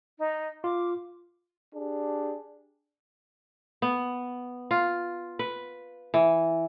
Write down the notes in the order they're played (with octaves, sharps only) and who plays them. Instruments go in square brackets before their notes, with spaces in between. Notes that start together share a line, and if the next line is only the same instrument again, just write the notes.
[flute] D#4
[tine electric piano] F4 [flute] D6
[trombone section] D4 G4 G#4
[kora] B3
F4
B4
E3